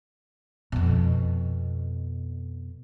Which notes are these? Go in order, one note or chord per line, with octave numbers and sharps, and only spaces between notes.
F2 B2